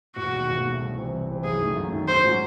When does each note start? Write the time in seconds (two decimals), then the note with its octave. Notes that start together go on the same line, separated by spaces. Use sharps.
0.16 E1 F#4
0.33 D#2 D#3 A3
0.49 E1
0.64 D#2 D#3 A3
0.80 C2
0.96 C3 E3 C4
1.12 C2
1.29 C3 E3 C4
1.44 F#2 G#4
1.60 D#3 A3
1.77 F#2
1.92 D#3 A3
2.08 G#2 C5
2.24 F#3 C#4 F#4